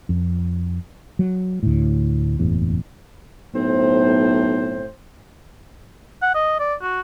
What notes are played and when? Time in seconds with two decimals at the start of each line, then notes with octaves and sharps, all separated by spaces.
0.09 F2
1.19 F#3
1.63 D2 A2
2.39 F#1 E2 A2
3.54 B1 A2 C4 C5
6.22 F#5
6.35 D#5
6.59 D5
6.82 F#4